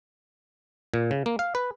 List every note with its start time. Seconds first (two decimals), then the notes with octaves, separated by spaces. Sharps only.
0.94 A#2
1.11 C#3
1.26 A#3
1.39 F5
1.55 B4